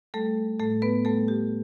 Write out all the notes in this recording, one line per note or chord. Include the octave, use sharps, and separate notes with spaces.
G3 A3 A4
A2 A3 A4
B3 B4
G3 A3 A4
G4